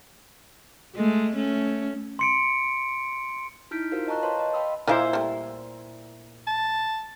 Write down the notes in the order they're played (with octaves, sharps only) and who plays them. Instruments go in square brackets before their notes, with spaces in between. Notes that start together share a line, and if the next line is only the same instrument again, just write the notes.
[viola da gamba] G#3 A3
A3 C#4
[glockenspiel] C6 C#7 D7
[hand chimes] D#4 E4 F6 G6 B6 D7
F4 F#4 A#4 C5 F5
D#5 A5 A#5 C#6 F#6
B4 C#5 F5 A5 C6
D#5
F5 G5 B5 C6 D#6 E6
[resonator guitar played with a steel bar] A#2 E4 C5 [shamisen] F4 D#5 F5
[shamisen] G3 A3
[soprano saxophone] A5